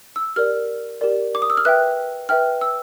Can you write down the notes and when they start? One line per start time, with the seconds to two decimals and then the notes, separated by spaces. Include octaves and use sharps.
0.16 E6
0.36 G4 A#4 D5 F6
1.01 G4 A#4 D5
1.35 D6
1.42 D#6
1.50 E6
1.57 F6
1.65 B4 E5 G5 F#6
2.29 B4 E5 G5 F6
2.61 E6